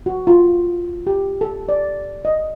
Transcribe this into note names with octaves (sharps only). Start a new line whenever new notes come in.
F#4
F4
G4
A4
D5
D#5